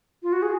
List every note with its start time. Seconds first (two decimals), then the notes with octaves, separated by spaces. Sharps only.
0.23 F4
0.33 F#4
0.42 G#4